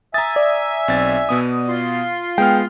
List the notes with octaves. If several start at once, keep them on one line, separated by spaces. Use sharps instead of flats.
E5 G#5 A#5 D#6 A6
D5
B1 C4 A6
B2 B3 D#6
F4 C6
G#3 B3 G5 F6